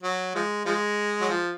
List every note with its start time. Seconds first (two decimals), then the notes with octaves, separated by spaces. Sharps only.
0.03 F#3
0.35 F3 G#3
0.66 F3 G#3
1.21 F#3
1.29 F3